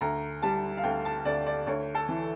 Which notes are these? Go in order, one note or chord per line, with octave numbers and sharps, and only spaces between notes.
D2 A#5
G3 A5
F5
D2 G5
A5
D2 D5
D5
D2 C#5
A4
E3